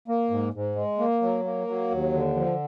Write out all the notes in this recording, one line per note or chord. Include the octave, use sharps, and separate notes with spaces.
A#3
G#2
G#2
G#3
A#3
F#3
A#3
F#3
D#2
D3
F3